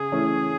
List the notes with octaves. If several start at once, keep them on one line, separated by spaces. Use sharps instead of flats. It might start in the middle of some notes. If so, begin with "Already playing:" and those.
Already playing: C#3 G#4
E3 A3 C#4 E4